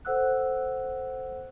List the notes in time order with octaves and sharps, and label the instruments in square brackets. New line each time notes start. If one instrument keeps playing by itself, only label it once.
[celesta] A4 C5 F#5 E6 F#6